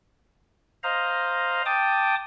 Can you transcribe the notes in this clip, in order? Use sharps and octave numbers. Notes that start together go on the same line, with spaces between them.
C5 D#5 F5 A#5
G5 A5 D6 D#6